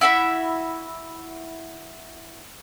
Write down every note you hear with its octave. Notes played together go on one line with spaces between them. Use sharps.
E4 F#4 E5 B5